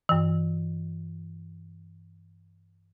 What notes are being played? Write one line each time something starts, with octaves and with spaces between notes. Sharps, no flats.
G2 E3